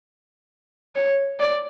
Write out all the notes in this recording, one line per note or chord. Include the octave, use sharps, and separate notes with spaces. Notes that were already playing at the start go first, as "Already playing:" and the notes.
C#5
D5